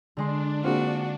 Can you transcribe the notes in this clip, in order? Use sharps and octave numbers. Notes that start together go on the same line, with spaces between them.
D3 G#3 D4 C6
A#3 C4 F4 F#4 G#4